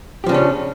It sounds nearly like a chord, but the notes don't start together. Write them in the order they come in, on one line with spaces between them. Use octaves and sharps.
G4 F3 C#3 D4 C#4